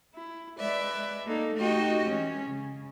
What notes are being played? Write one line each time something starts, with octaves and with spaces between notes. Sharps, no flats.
E4
G#3 B4 D5 E5
A#3 D#4 A4
A3 D#4 F#4 G4 D#5 G5
E3 G#3 C#4
C#3